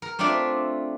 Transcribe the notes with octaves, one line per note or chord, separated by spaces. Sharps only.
A#4
A3 C4 D4 F4 D5 E5